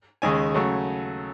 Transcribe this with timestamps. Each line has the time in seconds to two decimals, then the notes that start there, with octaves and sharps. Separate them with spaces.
0.22 D#2 C#3 G#3 G#5
0.54 C#3 F#3 A3